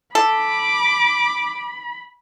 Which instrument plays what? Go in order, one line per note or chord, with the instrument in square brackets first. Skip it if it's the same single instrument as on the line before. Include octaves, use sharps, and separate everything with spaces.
[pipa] A4 [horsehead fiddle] B5 [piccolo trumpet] D6